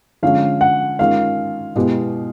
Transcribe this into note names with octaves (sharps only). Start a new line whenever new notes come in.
D3 F3 G#3 C#4 F5
F#5
D#3 G#3 C#4 F4 F5
B2 G#3 B3 E4 G4